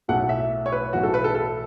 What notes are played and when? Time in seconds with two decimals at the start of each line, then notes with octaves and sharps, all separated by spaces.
0.08 B1 A2 A3 F#5
0.29 E5
0.66 C#5
0.72 B4
0.93 B1 A2 E3 F#4
1.03 A4
1.14 B4
1.24 A4
1.35 A4